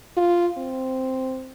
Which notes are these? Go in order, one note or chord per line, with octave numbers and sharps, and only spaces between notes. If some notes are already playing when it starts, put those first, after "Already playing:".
F4
C4